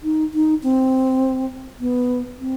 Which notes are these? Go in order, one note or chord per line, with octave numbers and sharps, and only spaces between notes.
D#4
D#4
C4
B3
C4